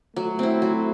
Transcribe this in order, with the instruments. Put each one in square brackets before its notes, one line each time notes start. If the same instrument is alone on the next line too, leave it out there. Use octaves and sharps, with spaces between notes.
[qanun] F#3 [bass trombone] A3
[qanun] C4 E4
F#3